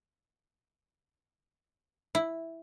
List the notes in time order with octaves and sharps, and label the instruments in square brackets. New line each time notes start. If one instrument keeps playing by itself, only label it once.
[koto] E4